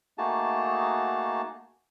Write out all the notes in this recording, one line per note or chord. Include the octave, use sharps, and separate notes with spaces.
A3 A#3 D#4 F#4 G#4 A5